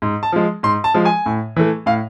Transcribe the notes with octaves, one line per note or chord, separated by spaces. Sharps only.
G#2
A5
F3 G#3
G#2 C6
A5
F3 G#3
G#5
A2
E3 A3
A2 F5